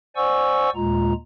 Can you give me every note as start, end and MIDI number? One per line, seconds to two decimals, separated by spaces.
0.16 0.70 72
0.16 0.70 74
0.16 0.70 78
0.16 0.70 80
0.16 0.70 85
0.16 0.70 88
0.75 1.13 39
0.75 1.13 46
0.75 1.13 56
0.75 1.13 65
0.75 1.13 82